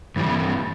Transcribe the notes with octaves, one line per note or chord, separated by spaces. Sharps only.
G2 E3 G3